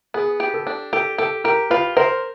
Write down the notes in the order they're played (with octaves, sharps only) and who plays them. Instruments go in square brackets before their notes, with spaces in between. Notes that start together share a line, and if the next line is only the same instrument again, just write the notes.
[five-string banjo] B3 [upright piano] G#4
[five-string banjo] G4
[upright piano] A4
[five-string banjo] D4
[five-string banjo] G4 [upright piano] A4
[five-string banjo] G4 [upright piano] A4
[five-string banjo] G4 [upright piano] A#4
[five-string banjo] F4 [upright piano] B4
[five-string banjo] A#4 [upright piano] C5